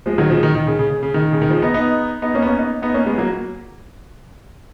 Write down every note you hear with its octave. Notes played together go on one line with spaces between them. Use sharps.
F3 G#3
D#3 F#3
C#3 F3
D#3
D#3
C#3
C#3
C#3
C#3
D#3
C#3
D#3
C#3 F3
B3 D#4
B3 D#4
B3 D#4
A#3 C#4
B3
A#3 C#4
B3 D#4
B3 D#4
A#3 C#4
G#3 B3
F#3 A#3